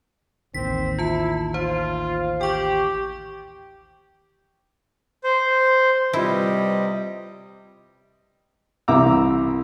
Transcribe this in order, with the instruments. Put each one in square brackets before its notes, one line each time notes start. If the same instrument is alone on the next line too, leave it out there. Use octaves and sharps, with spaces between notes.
[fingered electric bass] A1 D#2 D#3 [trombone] C4 [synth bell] B6
[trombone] E4 [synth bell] F4 A5
[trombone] F4 [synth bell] C5
[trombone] G4 [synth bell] G5 C#6
[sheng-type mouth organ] C5
[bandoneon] C3 D#5 [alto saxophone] G3 [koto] E4 [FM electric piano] F4 B4
[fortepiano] C2 E3 E5 A#5 D6 E6